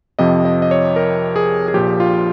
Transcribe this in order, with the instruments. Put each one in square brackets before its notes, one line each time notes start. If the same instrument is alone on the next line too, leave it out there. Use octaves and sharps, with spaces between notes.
[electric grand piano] F2 C3 F3 D#5
D#5
D#5
C#5
A#4
G#4
G#4
A#1 A#2 F3 G4
F4